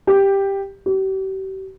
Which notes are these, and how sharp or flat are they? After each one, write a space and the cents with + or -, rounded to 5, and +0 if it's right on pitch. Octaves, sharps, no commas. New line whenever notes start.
G4 +5
G4 -40